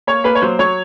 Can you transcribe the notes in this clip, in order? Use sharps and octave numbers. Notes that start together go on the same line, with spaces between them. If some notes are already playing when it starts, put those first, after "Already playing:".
A#3 C#5
A#3 B4
C#5
F#3 C5
F#3 C#5